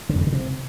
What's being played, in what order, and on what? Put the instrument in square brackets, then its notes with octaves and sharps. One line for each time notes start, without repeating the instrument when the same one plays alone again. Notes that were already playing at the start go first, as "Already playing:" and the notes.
[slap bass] D3
F2
C#3
D3
C3